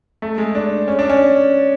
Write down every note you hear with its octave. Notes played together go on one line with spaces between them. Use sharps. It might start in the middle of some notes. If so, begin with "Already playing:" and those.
A3
G#3
D4
C#4
D4
C#4